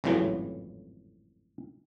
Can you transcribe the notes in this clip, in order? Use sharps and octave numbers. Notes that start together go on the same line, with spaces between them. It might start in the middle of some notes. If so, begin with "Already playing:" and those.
G#1 F2 A2 C#3 E3 F#3